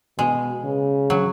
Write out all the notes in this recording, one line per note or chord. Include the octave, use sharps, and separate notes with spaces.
B2 G#3
C#3
F#3